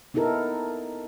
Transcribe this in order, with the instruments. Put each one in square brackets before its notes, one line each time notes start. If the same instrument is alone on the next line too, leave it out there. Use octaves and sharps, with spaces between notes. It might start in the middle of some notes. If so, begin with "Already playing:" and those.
[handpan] B3 D#4 E4 A4 A#4